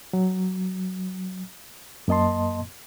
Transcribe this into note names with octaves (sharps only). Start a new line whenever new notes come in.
F#3
F#2 A#3 D#5 A5 C6